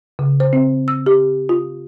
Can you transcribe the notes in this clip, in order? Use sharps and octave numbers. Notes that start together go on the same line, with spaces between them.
C#3
C5
C4
E6
G4
F4